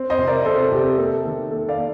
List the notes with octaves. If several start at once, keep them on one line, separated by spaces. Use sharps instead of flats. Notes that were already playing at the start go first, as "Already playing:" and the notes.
Already playing: C4
C5 D#5
C3
A#4 D5
C3 A4 C5
A4
C3 G4
A4
A#3 A4
D#3
A#3 A4
D5 F5
A#3